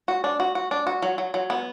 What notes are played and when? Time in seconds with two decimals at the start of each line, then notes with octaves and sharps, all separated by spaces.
0.08 F#4
0.24 D4
0.40 F#4
0.55 F#4
0.71 D4
0.87 F#4
1.02 F#3
1.18 F#3
1.34 F#3
1.50 B3